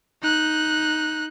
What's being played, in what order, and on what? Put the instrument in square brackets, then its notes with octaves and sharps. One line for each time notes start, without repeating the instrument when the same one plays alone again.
[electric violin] D#4 F#6